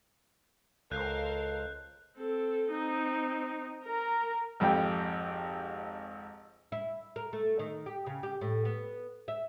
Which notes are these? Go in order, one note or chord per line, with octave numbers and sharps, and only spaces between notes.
C#2 A4 A#4 C5 F5 F#6 G6
C4 A4
C4 D#4
A#4 A#5
G#1 F2 G4 G5
E4
A#4
A3
D#3
G4
C#3
G4
A2
B3
E5